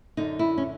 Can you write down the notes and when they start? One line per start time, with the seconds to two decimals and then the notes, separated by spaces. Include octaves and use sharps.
0.17 F#2 D3 D#4
0.39 E4
0.57 C#4